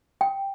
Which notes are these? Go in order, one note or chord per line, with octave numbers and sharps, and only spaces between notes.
G5